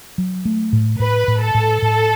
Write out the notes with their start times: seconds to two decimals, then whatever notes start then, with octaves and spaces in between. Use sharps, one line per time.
0.18 F#3
0.45 A3
0.73 A2
1.00 A2 B4
1.28 A2
1.41 A4
1.54 A2
1.82 A2